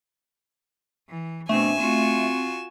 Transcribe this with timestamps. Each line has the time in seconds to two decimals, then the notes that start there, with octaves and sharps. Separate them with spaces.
1.09 E3
1.49 B2 A3 C4 D4 G#5 E7
1.80 C4 F4 F#4